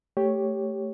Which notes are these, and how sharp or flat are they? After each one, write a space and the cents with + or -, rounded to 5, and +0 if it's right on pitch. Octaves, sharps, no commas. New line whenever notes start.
A3 +0 G4 +5 C#5 +0